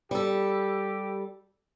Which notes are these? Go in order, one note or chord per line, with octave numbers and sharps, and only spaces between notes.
G3 G4 A4